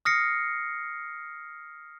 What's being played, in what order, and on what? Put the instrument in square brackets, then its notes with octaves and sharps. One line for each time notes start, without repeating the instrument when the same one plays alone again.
[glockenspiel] D#6 F6 A#6 C7 C#7